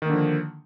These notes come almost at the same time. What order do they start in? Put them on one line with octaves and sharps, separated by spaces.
D#3 A#3 D3 F3